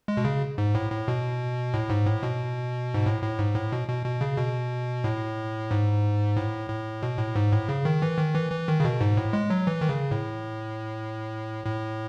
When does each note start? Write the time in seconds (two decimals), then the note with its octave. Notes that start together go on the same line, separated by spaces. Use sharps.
0.08 G#3
0.17 B2
0.25 C#3
0.58 G#2
0.75 A2
0.91 A2
1.08 B2
1.74 A2
1.90 G#2
2.07 A2
2.23 B2
2.94 G#2
3.06 A2
3.22 A2
3.39 G#2
3.55 A2
3.72 B2
3.88 B2
4.05 B2
4.21 C#3
4.38 B2
5.04 A2
5.71 G#2
6.37 A2
6.70 A2
7.03 B2
7.18 A2
7.35 G#2
7.51 A2
7.69 C#3
7.85 D#3
8.02 E3
8.19 D#3
8.35 E3
8.51 E3
8.68 D#3
8.80 C#3
8.85 B2
9.01 G#2
9.17 A2
9.33 G#3
9.50 F#3
9.67 E3
9.81 D#3
9.89 C#3
10.11 A2
11.66 A2